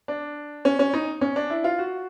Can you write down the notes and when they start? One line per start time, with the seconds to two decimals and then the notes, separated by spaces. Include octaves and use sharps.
0.08 D4
0.65 C#4
0.79 C#4
0.94 D#4
1.21 C#4
1.36 D4
1.50 E4
1.64 F4
1.78 F#4